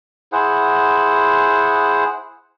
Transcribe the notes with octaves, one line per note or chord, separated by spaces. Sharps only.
E4 G#4 C5 F#5